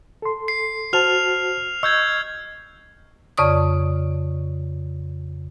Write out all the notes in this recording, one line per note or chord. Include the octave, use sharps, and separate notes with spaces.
A4 C6
C7
F#4 C5 A5 F6 F7
D#5 C#6 E6 G6 G#6
F2 C#3 D5 C#6 D#6